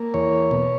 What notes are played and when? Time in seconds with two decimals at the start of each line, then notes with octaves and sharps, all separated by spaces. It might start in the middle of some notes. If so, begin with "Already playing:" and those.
Already playing: A#3
0.14 E2 C#5
0.51 B2